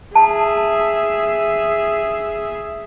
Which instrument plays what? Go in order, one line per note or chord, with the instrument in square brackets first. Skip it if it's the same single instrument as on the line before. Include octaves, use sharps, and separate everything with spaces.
[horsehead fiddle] G#4 E5 [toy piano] A5